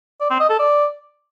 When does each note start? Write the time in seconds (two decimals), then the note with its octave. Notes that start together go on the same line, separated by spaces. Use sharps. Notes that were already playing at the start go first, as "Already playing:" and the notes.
0.21 D5
0.30 C4
0.40 D#5
0.50 A4
0.60 D5